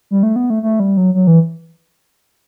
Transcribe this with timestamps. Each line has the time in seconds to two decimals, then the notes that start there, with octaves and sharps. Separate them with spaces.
0.11 G3
0.23 A3
0.36 B3
0.50 A3
0.63 A3
0.80 G3
0.97 F#3
1.14 F#3
1.27 E3